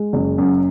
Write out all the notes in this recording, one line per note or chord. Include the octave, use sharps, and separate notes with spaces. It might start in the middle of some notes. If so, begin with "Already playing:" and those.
Already playing: G#3
F#1
F#2